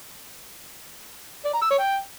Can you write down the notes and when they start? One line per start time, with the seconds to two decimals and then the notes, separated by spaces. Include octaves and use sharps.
1.45 D5
1.54 A#5
1.62 E6
1.71 C#5
1.79 G5